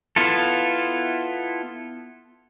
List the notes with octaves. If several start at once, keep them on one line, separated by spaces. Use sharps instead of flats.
B3 E4 F4 A4